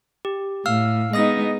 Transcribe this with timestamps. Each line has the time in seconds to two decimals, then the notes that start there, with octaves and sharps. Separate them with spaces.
0.25 G4
0.66 A2 F5 E6 F6
1.13 G#3 B3 D#4 D#5 D#6 A#6